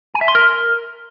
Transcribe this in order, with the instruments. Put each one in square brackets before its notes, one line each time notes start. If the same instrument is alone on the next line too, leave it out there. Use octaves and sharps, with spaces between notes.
[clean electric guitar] G#5
E5
C6
A#4